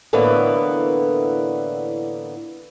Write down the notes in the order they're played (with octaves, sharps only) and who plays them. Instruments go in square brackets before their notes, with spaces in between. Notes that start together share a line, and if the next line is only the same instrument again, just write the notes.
[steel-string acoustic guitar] A2 D3 E3 A#3 B3